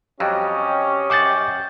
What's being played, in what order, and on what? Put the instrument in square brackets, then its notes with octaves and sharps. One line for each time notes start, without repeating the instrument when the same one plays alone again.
[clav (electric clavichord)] F2 F#3 G3 [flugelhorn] C#4 [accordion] G4 D#5
[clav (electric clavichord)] F#2 C5 F#5 [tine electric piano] D6 G6 A6